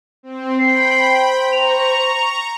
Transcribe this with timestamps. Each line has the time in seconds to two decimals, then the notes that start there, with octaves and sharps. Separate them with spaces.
0.23 C4
0.59 C5 G5 B5 C7
1.52 A#5 C#6 F7